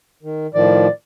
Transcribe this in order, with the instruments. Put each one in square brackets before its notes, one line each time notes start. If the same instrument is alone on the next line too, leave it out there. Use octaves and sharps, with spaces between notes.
[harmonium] D#3
[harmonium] A2 D#3 F3 [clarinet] D5